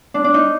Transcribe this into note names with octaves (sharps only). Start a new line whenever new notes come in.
D4
D4
D#4